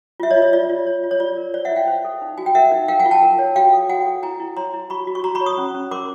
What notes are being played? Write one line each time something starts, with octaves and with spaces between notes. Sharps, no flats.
F4 E5
C#5 D#5
F4
C#5
F4 D5
F4
C#5
F4
C#5
F4 D5
A#4
C5 D5
E5 F#5
E4 F5 G5
C5
A4
D#4
F#4 G#5
G5
A#4 E5 F#5
D#4
A#4 F5 G5
F#5 G#5
F4
G5 A5
A#4
C#5
F#4 F5 G5
A4
F#4 F#5 G#5
A4
E4 G#5 A#5
E4
C#5 A#5 C6
E4
F#4 B5 C#6
F#4
C#6
F#4 A#5 C6
B5 C#6
C#5
C#6 D#6
C#4
C#4
A#4 C6 D6